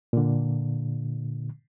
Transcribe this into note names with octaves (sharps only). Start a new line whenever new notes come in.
A#2 D3